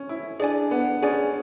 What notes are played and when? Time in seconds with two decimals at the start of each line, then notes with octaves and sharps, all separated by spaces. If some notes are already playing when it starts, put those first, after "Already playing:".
Already playing: C#4
0.09 E4
0.40 D4 G#4 D5 G#5
0.71 B3
1.03 C#4 G#4 D5 G#5